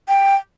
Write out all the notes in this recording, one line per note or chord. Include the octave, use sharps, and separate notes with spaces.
G5